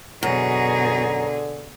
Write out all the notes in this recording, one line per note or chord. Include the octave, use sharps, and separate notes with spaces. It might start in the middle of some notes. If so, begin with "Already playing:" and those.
F#2 B2 D3 G#4 A#5